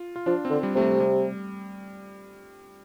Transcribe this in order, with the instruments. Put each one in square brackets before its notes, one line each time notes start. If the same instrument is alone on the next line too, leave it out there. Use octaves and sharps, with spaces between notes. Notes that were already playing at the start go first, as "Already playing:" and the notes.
Already playing: [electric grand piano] F4
F4
[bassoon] F3 [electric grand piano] D4
[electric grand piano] C4
[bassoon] D3
[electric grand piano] G3
[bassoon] C3 [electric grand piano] A3
[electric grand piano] G3
G3